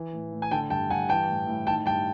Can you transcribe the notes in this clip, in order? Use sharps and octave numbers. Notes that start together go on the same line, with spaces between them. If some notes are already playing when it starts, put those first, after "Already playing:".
Already playing: E3
A2
A2
G#5
D3 G5 A5
G2 G5 A5
G2 F#5 G#5
E3 G5 A5
A2
A2
D#3 G5 A5
G2 G5 A5